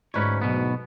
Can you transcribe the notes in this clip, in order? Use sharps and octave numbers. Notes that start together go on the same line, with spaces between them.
D2 G#2 C#4 B4 C#5
B1 B2 B3